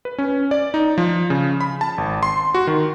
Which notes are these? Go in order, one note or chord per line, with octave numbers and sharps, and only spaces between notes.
B4
C#4
D5
D#4
F3
C#3
B5
A5
G#1
C6
F#4
D#3